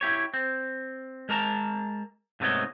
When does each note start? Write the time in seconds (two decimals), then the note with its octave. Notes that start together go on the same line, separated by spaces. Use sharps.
0.01 E4 G4 C#5
0.34 C4
1.29 G#3 A#4 A5 A#5
2.40 G#2 C3 A3 B3 C#5 D#5